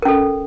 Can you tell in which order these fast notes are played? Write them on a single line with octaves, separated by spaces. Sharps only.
A#4 C#4 A4